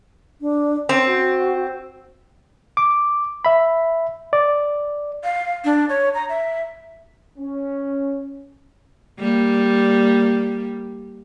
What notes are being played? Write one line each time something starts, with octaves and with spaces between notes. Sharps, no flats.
D4
C4 C#4
F#4
D6
E5 B5
D5
F5
D4
C#5
A#5
E5
C#4
G3 A#3